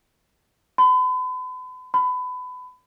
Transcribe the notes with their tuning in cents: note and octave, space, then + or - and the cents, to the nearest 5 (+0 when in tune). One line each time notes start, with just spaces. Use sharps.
B5 +45
B5 +25